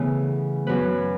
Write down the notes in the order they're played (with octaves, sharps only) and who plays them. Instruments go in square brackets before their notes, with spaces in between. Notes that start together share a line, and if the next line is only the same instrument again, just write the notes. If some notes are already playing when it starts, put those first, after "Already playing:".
Already playing: [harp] C#3 E3 A3 B3 C#4
F#2 F#3 B3 B4